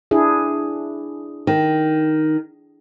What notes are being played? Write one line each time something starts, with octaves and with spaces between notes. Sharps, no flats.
D4 E4 G#4
D#3